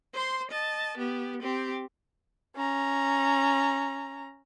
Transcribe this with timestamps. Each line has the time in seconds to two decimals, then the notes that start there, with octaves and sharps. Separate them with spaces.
0.13 C5 C6
0.51 D#5 A5
0.98 B3 G4
1.42 C4 G4
2.56 C#4 A#5